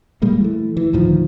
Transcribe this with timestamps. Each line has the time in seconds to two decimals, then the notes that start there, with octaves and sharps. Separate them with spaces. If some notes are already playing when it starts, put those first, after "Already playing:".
0.22 A#2 G3 G#3 A#3
0.41 E3 A3
0.77 E3
0.93 D2 A2 D#3 F3